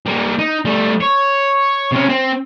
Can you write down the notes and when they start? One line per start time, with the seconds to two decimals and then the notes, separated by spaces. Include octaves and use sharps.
0.06 G3 A#3
0.39 D#4
0.65 G3 A3
1.00 C#5
1.92 C3 C#4
2.09 C4